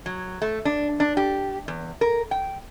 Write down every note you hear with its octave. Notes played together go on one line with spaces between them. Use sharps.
F#3
A3
D4
D4
G4
E2
A#4
G5